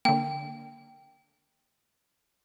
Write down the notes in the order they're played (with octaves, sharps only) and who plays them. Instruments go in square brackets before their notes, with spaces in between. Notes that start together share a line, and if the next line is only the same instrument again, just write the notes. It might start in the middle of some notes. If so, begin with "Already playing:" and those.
[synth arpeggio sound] D3 A#3 [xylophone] G5